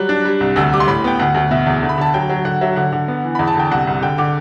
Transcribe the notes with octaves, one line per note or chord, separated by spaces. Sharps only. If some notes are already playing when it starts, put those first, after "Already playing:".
Already playing: F#3 G3 F#6
D4
G3
C2
D2 E6
E6
G3 D6
C6
A2 B5
B3 G5
D2 F#5
D2
B2 E5
E2
D3
B5
D3 A5
F#3 G5
F#3
D3 F#5
F#3 E5
D3 F#5
D3
B3
E3
E2 B5
A5
D3 G5
C2 F#5
C2
D3 G5
D3 D6